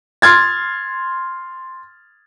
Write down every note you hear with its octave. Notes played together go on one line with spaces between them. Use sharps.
C6 F6 G#6 A6